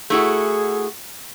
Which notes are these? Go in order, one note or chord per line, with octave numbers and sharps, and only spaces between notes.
A3 E4 F#4 G#4